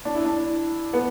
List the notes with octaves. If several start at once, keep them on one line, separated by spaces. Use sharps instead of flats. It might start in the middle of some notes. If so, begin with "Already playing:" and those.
D4
E4
D4
B3